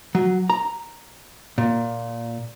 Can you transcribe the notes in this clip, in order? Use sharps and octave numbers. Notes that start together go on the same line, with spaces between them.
F#3
A#5
A#2